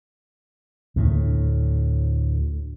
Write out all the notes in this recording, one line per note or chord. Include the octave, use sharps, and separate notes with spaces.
D2 A2